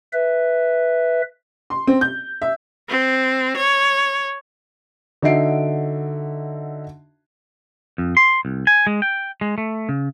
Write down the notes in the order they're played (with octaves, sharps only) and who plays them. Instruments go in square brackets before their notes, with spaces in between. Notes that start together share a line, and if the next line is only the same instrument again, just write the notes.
[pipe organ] B4 E5
[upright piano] C6
C4
G6
E5
[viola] C4
C#5
[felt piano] D3 D#4 F#4 E5 C7 D7
[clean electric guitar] F2
C6
C2
G#5
G#3
G5
G#3
A3
C#3